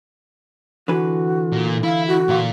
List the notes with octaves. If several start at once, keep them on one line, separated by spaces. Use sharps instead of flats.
D3 E3 F#4 B4
A#2
E4 F5
F#4
A#2 F5